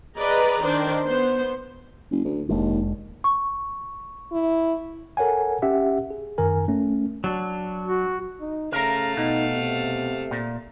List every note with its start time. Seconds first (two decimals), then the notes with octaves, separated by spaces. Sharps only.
0.17 G#4 B4 D5 D#5 A#5
0.62 D#3 D4 C5
1.05 B3 C5
2.11 F#1
2.24 D2
2.49 F1 D#2 G#3 D4
3.24 C#6
4.32 E4
5.17 A4 A#4 C#5 F#5 G#5
5.62 C#4 G4 E5 F#5
6.10 G#4
6.38 F#2 D#3 A#4 G#5
6.68 A3 C#4
7.24 F#3 D4
7.87 F#4
8.41 D#4
8.72 C#3 A3 A#4 F5 A#5
9.17 B2 D#4
9.54 C3
10.31 A#2